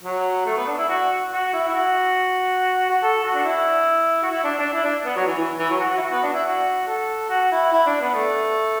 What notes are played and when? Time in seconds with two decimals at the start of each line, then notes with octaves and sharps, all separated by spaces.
0.03 F#3
0.46 A3
0.57 B3
0.67 D4
0.78 E4
0.89 F#4
1.31 F#4
1.53 E4
1.68 E4
1.74 F#4
2.90 F#4
3.02 A4
3.24 F#4
3.35 D4
3.45 E4
4.23 F#4
4.31 E4
4.44 D4
4.59 D4
4.73 E4
4.84 D4
5.05 B3
5.16 F#3
5.27 E3
5.37 E3
5.59 E3
5.69 F#3
5.80 F#4
5.91 F#4
5.97 E4
6.01 F#4
6.12 B3
6.23 D4
6.33 E4
6.44 F#4
6.87 A4
7.30 F#4
7.51 E4
7.72 E4
7.86 D4
8.01 B3
8.15 A3